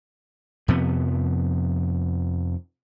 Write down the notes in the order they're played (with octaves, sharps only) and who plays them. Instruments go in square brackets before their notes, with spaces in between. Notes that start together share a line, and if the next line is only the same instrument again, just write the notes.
[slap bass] F2 C3 F3 B3